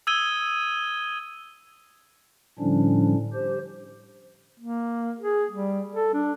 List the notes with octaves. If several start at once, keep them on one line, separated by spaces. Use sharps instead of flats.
D#6 E6 G#6 D#7 G7
A2 D3 F3 G3 C#4 D4
G4 C5
A#3
G#4
G3
A4
D4